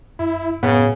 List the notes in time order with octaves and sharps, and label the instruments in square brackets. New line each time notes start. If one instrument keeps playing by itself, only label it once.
[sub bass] F#2 [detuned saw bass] E4
[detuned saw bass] F#2 [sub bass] A2 [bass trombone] C#3 [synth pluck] B3